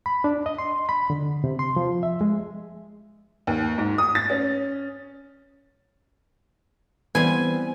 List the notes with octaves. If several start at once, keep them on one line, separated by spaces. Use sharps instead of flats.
B5
D4
D#5
C6
B5
D3
C3
C6
F3
E5
G#3
D#2
G#2
D#6
A6
C#4
E3 G3 B3 C4 G#5